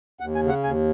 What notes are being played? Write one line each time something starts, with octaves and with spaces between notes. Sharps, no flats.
D#2 F#5
G#5
C#3
F#5
D#2 G#5